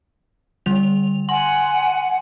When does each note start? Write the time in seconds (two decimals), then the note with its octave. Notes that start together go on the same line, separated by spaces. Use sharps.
0.66 D3 G3 F7
1.29 F#5 G#5 C6 F#7